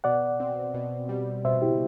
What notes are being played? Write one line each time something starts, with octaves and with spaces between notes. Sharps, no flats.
B2 D5 F#5
C4
B2
G3
B2 C5 E5
E4 G4